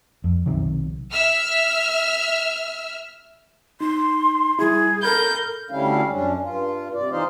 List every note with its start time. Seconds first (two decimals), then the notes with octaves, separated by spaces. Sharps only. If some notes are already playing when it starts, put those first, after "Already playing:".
0.24 F2
0.46 B1 C3 D#3 F#3
1.12 E5 E6 F6
3.81 D#4 C6
4.59 G3 E4 G#4
5.03 A4 A#4 B5 G6
5.71 D2 D3 G3 C#4 E4 F5
6.10 F#2 C#4 D4
6.42 G2 F4
6.94 C3 D5
7.11 E3 D#4 F4 C5 D#5 F5